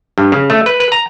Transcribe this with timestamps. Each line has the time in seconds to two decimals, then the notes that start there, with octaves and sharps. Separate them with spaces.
0.18 G2
0.32 C#3
0.50 A3
0.66 B4
0.80 B4
0.92 A#5